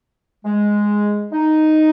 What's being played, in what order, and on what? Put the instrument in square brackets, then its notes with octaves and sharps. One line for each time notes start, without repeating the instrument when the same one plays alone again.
[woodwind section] G#3
D#4